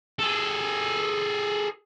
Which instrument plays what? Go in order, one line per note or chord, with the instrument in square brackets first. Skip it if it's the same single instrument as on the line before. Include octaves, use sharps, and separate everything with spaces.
[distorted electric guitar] G#4 A4